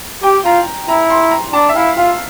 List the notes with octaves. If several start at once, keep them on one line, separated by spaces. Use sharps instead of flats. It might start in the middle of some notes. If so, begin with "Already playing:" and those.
G4 G5
F4 A#5
E4 A#5
C6
A#5
D4 A5
E5
E4 F5
F4 F5